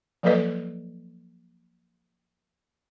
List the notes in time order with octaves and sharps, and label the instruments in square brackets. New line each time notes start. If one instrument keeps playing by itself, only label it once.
[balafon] F3 F#3 A#3 A4 B4 D#5